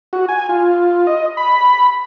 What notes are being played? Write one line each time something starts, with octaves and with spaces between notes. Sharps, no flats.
F#4
G#5
F4
D#5
B5